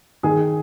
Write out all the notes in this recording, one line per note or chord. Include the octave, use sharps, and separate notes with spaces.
D#3 G#4